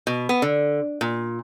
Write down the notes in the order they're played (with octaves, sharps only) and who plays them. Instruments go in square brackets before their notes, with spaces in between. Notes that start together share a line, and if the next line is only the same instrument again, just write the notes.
[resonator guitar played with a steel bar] B2
B3
D3
A#2